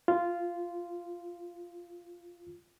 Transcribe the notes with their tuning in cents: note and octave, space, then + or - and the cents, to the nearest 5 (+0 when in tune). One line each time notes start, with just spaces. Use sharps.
F4 -10